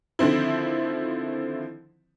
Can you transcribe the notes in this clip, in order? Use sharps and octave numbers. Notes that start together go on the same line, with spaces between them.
D3 D#3 F3 C4 E4